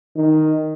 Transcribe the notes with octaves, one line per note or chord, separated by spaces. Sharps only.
D#3